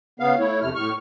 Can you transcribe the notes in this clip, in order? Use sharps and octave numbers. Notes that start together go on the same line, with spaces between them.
C#3 B3 F5
A3 E4 C#5
F2 C3 A3 F6
A2 C#6 F6